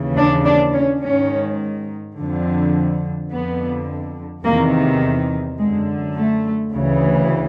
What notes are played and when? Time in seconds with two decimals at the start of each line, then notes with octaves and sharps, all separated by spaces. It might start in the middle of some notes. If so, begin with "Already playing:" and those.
Already playing: D#2 C#3 E3
0.17 D4
0.45 D4
0.73 C#4
1.02 G#2 D#3 C#4
2.16 F2 D3
3.30 F2 D3 B3
4.44 E2 C3 D#3 A#3
5.58 F#2 D3 G#3
6.15 A3
6.72 D2 C#3 E3